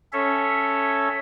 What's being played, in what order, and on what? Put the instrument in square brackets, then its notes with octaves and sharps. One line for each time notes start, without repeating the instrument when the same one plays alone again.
[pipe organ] C#4 A4 C#5 E5